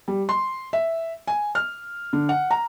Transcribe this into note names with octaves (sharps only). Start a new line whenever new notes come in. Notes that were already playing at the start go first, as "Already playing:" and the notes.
G3
C6
E5
G#5
F6
D3
F#5
A#5